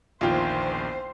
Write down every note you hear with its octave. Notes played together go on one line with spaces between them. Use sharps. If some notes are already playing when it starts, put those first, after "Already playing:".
A#1 E2 D#3 F4 C5 G5